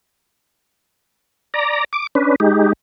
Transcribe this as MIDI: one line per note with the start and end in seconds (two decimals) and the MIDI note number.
1.54 1.84 74
1.54 1.84 82
1.93 2.07 86
2.15 2.35 61
2.15 2.35 62
2.15 2.35 71
2.40 2.73 56
2.40 2.73 63
2.40 2.73 67